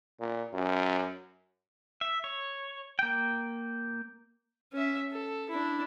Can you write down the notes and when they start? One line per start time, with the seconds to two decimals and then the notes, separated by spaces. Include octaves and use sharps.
0.20 A#2
0.53 F#2
2.01 E5
2.24 C#5
2.99 A#3 G5
4.73 C#4 E5
5.11 A4
5.50 D4 E4